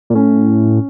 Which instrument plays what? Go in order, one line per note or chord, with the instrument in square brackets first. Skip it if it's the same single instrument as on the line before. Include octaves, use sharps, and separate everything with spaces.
[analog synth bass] A#2
[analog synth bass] A2 [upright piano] C#4